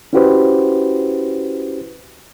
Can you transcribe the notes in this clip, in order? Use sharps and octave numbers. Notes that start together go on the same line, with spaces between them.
C#4 E4 F#4 G4 B4 C5